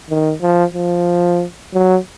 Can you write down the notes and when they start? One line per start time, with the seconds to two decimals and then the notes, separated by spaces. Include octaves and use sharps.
0.10 D#3
0.42 F3
0.75 F3
1.74 F#3